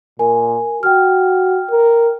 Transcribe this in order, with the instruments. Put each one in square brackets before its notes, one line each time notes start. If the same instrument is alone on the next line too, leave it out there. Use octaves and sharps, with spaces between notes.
[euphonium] A#2 [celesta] A#4 G#5
[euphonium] F#4 [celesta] G5 F6
[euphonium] A#4